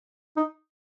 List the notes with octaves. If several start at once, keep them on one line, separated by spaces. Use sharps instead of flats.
D#4